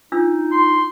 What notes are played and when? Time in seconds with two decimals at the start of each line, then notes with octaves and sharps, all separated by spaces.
0.12 D4 D#4 F4 E6
0.52 C6